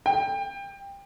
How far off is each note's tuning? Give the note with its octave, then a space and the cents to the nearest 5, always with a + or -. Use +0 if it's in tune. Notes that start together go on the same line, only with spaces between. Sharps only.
G5 +25